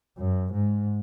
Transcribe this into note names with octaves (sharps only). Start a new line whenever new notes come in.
F#2
G#2